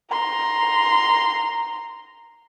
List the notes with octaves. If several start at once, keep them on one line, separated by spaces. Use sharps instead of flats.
A#5 C6